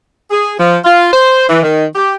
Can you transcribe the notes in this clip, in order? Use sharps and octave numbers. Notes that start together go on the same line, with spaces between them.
G#4
F3
F4
C5
E3
D#3
G4